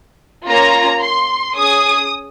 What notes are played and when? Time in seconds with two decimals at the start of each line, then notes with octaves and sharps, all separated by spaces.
0.47 A#3 C#4 F4 A#5
1.01 C6
1.55 C#4 G#4 D#6